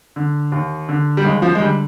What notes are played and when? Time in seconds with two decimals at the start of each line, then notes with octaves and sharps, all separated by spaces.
0.16 D3
0.52 D#2
0.89 D3
1.17 G3
1.25 D#2 G#3
1.42 F3
1.55 G#3
1.60 D3 G3